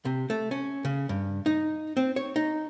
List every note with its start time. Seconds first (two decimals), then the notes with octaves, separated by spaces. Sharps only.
0.05 C3
0.30 A3
0.51 C#4
0.85 C#3
1.09 G2
1.46 D#4
1.97 C4
2.16 C#5
2.36 D#4